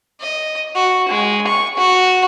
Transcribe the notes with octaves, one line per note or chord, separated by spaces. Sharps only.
D#5
F#4
G#3
C#6
F#4